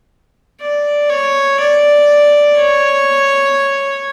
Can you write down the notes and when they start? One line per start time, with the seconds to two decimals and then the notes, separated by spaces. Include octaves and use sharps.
0.61 D5
1.10 C#5
1.60 D5
2.57 C#5